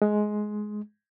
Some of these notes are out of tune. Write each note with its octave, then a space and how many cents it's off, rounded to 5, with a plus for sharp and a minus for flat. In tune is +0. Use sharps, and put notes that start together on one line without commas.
G#3 +15